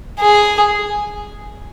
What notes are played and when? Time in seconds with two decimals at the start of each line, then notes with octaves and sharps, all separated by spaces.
0.19 G#4